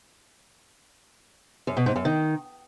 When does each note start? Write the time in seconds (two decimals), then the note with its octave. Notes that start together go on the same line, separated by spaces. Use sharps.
1.67 F#2
1.77 B2
1.86 G#2
1.96 F#2
2.05 D#3